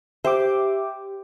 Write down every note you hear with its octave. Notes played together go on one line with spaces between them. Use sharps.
G4 C5 E5 G5 D6